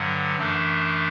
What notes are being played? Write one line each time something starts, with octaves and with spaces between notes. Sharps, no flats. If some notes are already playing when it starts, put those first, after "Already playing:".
Already playing: G2 D3 F#3 F#5
F#2 E3 A3 D4